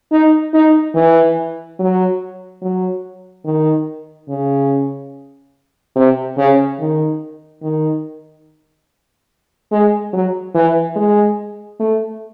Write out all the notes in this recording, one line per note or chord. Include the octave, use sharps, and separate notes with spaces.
D#4
D#4
E3
F#3
F#3
D#3
C#3
C3
C#3
D#3
D#3
G#3
F#3
E3
G#3
A3